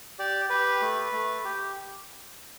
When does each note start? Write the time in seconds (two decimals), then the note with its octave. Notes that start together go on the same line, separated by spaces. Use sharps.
0.19 G4 D5
0.50 G4 B4
0.81 A3
1.13 A3
1.45 G4